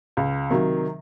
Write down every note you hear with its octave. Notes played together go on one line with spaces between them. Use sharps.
C#2
C3 D#3 F#3